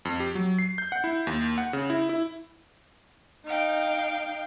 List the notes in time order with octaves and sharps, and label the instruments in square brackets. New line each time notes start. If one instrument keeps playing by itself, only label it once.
[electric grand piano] F2
G4
F#3
C7
G6
F#5
E4
D#2
F#5
C#3
E4
E4
[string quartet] D#4 F5 G5